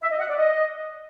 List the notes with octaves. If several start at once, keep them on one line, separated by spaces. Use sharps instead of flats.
E5
D#5
F#5
D5
D#5